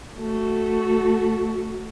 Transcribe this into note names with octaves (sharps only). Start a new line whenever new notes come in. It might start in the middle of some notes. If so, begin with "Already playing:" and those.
A3 F#4